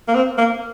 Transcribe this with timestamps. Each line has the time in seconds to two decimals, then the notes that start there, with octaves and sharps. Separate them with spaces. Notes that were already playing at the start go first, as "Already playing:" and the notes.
0.08 A#3
0.15 C4
0.38 A#3